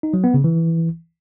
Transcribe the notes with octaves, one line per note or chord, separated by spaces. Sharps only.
D#4
F#3
B3
C#3
E3